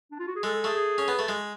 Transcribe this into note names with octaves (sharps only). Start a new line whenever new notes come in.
D4
F4
F#4
G#4
G#3 A4
A4
A3 G#4
G#4
C#4
B3
A3
G#3